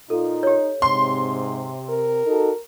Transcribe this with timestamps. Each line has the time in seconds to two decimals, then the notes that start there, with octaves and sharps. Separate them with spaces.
0.10 A#2 D#4 F4 A4
0.43 G4 C#5
0.82 G#2 C3 C6
1.89 A#4
2.26 D#4 F#4 A4